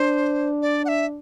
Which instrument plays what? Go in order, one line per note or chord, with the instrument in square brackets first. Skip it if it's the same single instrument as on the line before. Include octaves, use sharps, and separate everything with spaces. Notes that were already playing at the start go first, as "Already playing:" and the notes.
Already playing: [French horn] D4 [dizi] C5
[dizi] D5
F#5
E5